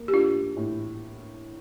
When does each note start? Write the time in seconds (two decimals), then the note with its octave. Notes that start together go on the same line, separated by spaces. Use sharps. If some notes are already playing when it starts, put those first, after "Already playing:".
Already playing: A#3
0.08 G4
0.13 D4 F4
0.56 A2